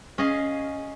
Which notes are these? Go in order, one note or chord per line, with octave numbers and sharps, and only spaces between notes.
C#4 G#4 D#5 F5